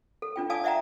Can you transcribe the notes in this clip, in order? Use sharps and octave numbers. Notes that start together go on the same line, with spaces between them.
A4
D4 F4 G5
D5 F5 G#5 A5 D#6
D5 E5 F#5 G5 A#5